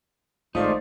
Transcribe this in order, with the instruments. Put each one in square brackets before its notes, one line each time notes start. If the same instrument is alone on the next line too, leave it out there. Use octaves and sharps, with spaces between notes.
[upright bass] G#1 [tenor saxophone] F3 [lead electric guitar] A3 D#4 [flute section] F4 C5 D5